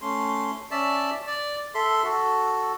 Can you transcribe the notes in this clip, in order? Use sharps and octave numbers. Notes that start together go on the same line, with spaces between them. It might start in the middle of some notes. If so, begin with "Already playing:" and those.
A3 C#4 C6
C#4 D5 E5 A5
D5
A4 E5 C6
F#4 A4